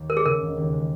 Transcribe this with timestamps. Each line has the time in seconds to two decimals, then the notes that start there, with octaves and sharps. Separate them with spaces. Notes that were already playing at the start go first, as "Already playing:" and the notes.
Already playing: D#2
0.09 G#3 A#4
0.17 G#4
0.25 C#3 A#4
0.41 E1
0.57 D#2
0.73 G#3